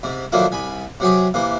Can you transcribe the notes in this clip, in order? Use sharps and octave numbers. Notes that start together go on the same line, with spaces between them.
G#2 C3
D3 D#3 F3 F#3 A#3 E4
C2 G#5 B5
C3 F#3 G4 G#4
C3 E3 A#3